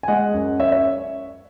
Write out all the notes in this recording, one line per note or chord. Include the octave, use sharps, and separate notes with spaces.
G#5
G#3 D#5 F#5
F#2
F#2 C#5 E5
C#5 E5